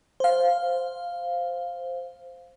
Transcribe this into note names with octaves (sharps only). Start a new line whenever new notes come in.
C5 F5